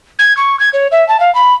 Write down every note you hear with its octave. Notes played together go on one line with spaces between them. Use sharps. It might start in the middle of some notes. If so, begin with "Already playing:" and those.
G#6
C#6
G#6
C#5
E5
A5
F5
B5